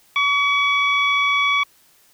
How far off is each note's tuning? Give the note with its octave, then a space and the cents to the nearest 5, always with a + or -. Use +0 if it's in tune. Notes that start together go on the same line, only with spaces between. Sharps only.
C#6 +40